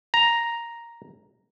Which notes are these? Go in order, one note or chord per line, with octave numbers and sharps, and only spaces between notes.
A#5